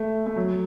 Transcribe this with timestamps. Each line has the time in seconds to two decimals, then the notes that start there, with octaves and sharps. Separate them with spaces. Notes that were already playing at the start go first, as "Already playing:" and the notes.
Already playing: A3
0.26 A3
0.36 F#3